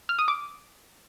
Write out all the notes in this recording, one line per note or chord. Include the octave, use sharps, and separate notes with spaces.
F6
D#6
D6